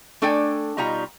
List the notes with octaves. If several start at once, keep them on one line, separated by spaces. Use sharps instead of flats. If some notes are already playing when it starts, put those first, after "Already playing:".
A3 D4 A4 D5 G5 G#5
B2 G3 D#4 F4 A#5